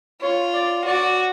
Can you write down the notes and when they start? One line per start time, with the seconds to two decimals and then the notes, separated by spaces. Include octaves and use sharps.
0.22 F4 C#5
0.54 D5
0.86 F#4 D5